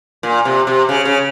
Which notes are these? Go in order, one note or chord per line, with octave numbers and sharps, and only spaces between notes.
A#2
C3
C3
C#3
C#3